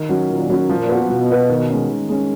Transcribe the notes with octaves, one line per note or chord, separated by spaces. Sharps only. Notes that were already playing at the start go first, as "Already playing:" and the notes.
Already playing: D#3
F#3 C#4 F#4
A#2 D#3
F#3 C#4 F#4
A#2 F3
B3 F#4 B4
B2 F3
B3 F#4 B4
D#3
G#3 C#4
D#3
G#3 C#4